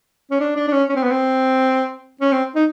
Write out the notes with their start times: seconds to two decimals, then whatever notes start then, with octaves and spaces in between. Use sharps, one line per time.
0.31 C#4
0.40 D4
0.56 D4
0.68 D4
0.72 C#4
0.89 C#4
0.96 C4
1.03 B3
1.11 C4
2.21 C#4
2.32 C4
2.55 D#4